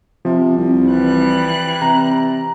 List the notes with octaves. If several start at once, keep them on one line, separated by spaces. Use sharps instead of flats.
C3 F3
C2
E3 G3 F#6
C3 A#5